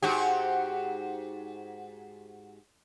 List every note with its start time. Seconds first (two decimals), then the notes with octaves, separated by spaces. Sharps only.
0.02 G#2 F#4 G4